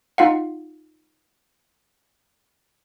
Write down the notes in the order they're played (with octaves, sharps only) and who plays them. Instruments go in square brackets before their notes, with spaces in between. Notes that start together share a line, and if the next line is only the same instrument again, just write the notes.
[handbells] D#4 F4 F5 F#5